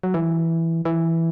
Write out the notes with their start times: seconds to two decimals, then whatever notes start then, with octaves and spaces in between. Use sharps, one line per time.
0.03 F#3
0.14 E3
0.85 E3